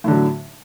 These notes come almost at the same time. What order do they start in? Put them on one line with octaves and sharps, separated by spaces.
A2 D3 F#3